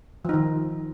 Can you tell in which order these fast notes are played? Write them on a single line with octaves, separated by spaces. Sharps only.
F3 D#4 D#3